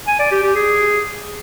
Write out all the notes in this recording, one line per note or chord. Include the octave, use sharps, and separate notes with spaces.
G#5
D5
G4
G4
G#4